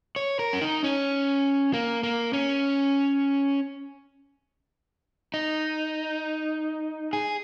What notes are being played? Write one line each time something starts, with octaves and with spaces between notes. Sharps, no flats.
C#5
A#4
C#4
D#4
C#4
A#3
A#3
C#4
D#4
G#4